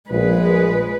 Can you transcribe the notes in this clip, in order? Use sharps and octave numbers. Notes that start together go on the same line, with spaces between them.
A#1 G#3 B4